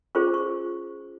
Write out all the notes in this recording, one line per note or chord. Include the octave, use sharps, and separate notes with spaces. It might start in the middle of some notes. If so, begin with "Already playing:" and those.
C#4 F4 G#4 C5 C#6
C#6